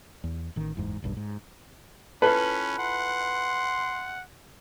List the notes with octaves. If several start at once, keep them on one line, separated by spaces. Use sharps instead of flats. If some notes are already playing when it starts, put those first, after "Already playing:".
E2
A1 D#3
F#1 E2 G#2
E1 B1 G2
G#2
C#4 E4 F4 A4 B4
F#5 C6